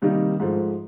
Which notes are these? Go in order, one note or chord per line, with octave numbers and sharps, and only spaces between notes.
C3 D#3 G3 A#3 D#4
G#2 F3 A3